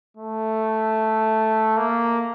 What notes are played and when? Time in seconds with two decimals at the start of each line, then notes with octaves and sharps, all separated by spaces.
0.17 A3
1.77 A#3